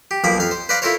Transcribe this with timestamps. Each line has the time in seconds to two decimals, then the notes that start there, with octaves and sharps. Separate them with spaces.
0.11 G4
0.24 B1 F3 A#3 B5 D6
0.38 F2 F5
0.51 C5
0.69 B4 C5 D5 F5 A#5
0.82 E4 F4 A4 A#4 C5 C#5